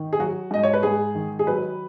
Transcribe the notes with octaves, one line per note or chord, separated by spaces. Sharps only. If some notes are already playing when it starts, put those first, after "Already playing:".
Already playing: D#3
G#4
F#3 F#4
G#2 D#5
C#5
B4
G#2 G#4
D#3
G#4
F#3 B4